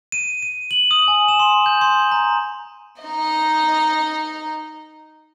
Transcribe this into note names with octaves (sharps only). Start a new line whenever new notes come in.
D#7
D#7
F#7
D#6
G#5
E7
C6
G6
C6
A#5
D#4 D#5